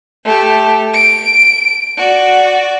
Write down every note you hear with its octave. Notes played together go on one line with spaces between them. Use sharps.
A3 G4
D7
F#4 D5